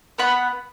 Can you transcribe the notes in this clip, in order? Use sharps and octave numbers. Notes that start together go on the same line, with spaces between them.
B3 F#5 B5